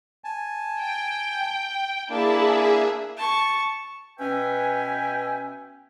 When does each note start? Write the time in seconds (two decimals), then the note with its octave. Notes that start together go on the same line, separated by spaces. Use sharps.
0.24 G#5 A5
0.78 G5
2.09 A#3 D4 E4 G#4 E5 A5
3.17 A5 C#6
4.19 B2 C#4 B4 E5 G5 G#5